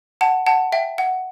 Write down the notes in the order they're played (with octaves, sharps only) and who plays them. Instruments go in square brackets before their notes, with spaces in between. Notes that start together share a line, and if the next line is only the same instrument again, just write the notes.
[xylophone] F#5 A5
F#5 A5
E5 G5
F#5